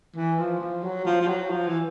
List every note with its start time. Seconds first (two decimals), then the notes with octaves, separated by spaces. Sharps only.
0.16 E3
0.39 F3
0.60 F3
0.84 F#3
1.05 F3
1.21 F3
1.27 F#3
1.50 F3
1.67 E3